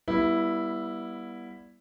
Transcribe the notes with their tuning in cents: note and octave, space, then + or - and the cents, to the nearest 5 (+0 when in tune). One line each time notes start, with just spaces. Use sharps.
G3 +0 B3 -25 E4 +0